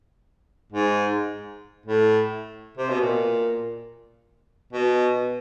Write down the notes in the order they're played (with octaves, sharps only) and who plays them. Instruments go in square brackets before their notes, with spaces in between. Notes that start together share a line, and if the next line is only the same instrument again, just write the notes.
[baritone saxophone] G#2
A2
C3
B2
A#2
B2